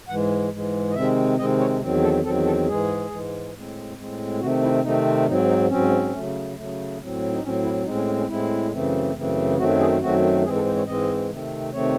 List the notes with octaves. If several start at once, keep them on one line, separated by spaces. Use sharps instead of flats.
G#2 E3 G#3 F#5
G#2 E3 G#3
D#5
C3 D#3 G#3 C4 E5
C3 D#3 G#3 C4 D#5
C#5
E2 D#3 F#3 C4
A4
E2 D#3 F#3 C4 A4
A4
G#2 E3 G#3 G#4
G#2 E3 G#3
A2 G#3 C4
A2 G#3 C4
C3 D#3 A3 C4 F#4
E4
C3 D#3 A3 C4 D#4
G#2 F#3 C4 D#4
D#4
G#2 F#3 C4 C#4
C#3 F#3 A3
C#3 F#3 A3
A2 F#3 C4
D#4
A2 F#3 C4 C#4
E4
A2 G#3 C4 D#4
C#4
C#4
C#4
A2 G#3 C4 E4
F#2 C#3 E3 A3 C4
F#2 C#3 E3 A3 C4
F#2 D#3 F#3 A3 C4 F#4
G#4
F#2 D#3 F#3 A3 C4 F#4
G#2 E3 G#3 C4 G#4
A4
C5
C#5
G#2 E3 G#3 C4 D#5
C3 D#3 A3 C4
C3 D#3 A3 C4 C#5